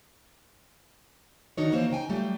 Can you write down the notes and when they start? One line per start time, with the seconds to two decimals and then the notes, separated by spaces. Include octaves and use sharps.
1.57 D#3 D4 D#4 F#4 A#4 C#5
1.72 E3 A#3 C4 C5 C#5
1.90 C#3 D#4 G5 G#5
2.09 F#3 G3 A3 F4 G4